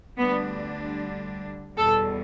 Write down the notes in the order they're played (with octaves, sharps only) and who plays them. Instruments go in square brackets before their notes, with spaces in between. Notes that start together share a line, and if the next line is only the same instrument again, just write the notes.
[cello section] D2 D3 G3 D4 [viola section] B3
[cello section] E2 B2 G3 [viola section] A4